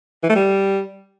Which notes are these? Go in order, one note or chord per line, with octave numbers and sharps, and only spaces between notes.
E3
A3
G3